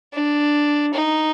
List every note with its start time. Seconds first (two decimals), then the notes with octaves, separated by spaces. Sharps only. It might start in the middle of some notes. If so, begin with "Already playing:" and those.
0.13 D4
0.93 D#4